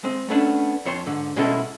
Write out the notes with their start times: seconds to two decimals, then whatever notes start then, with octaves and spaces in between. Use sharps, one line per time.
0.04 G#3 C4
0.29 A3 B3 C#4 D4
0.85 F2 C#5 C6
1.06 G#2 D3
1.36 B2 G#3 C#4 D#4 E4 A4